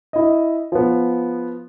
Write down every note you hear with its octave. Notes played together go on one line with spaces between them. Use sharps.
E4 D#5
F3 B3